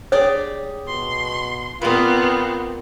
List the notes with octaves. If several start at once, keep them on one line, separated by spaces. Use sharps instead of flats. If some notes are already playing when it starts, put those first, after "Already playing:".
G4 G#4 C#5 D5
B2 C6
A#2 B3 C4 F4 B4